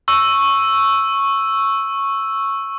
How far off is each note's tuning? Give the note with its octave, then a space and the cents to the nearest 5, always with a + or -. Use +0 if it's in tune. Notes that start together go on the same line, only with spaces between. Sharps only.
C#6 -10 E6 +0